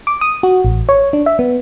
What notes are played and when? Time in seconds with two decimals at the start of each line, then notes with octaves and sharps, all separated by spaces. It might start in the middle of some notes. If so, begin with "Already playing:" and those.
0.07 D6
0.21 D#6
0.43 F#4
0.65 A1
0.89 C#5
1.13 D4
1.26 E5
1.39 B3